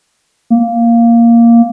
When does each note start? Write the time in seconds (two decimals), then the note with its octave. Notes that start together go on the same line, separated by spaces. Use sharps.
0.50 A#3